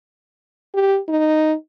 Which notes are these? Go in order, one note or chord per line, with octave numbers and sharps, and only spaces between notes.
G4
D#4